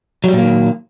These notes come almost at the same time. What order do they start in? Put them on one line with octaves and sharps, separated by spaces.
F#3 G3 A#2 A#3 D#3